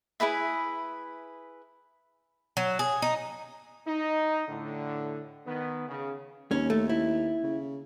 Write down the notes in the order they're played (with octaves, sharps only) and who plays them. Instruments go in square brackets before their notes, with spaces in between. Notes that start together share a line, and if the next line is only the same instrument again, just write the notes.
[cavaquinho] E4 G#4 B4 E5
[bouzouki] F#3
G#4
D#4
[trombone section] D#4
A2 D3
D#3 B3
C#3
[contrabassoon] D#2 [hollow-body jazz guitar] C#4
[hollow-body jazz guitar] A3
E4
[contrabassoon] C#3